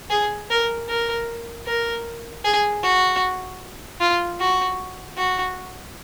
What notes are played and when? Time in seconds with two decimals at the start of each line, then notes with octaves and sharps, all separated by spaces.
0.10 G#4
0.50 A#4
0.89 A#4
1.66 A#4
2.44 G#4
2.83 F#4
4.00 F4
4.39 F#4
5.17 F#4